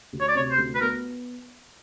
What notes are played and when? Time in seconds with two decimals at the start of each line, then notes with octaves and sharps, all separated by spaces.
0.13 D2
0.20 C#5
0.28 D5
0.35 C3 C#5
0.51 C5
0.58 D2
0.75 B4
0.81 B3 A#4